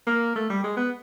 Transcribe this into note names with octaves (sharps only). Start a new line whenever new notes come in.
A#3
A3
G3
G#3
B3